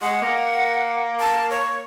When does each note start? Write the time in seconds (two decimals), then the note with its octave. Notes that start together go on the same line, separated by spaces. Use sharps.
0.02 G#3 F#5
0.21 A#3
1.19 A5
1.50 C#5